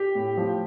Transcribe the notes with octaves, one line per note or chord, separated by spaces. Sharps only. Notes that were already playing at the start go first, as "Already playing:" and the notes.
Already playing: G4 G5
A2
F3